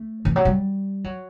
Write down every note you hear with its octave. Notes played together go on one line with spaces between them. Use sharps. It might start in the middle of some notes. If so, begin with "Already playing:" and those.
Already playing: A3
E3
F#3
G3
F#3